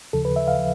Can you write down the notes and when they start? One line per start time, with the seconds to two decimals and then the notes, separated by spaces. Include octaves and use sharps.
0.13 D#2 C#3 F3 A4
0.25 B4
0.36 E5
0.48 F5
0.59 F3